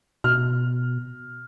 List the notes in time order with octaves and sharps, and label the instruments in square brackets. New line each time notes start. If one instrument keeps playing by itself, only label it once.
[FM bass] B2 [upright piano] F6